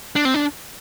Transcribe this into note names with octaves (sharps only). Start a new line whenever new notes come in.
D4
C4
D4